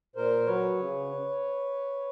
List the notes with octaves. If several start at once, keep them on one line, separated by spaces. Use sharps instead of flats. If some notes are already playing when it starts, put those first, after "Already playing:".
A#2 A#4 C5
F#3 B4 C#5
C#3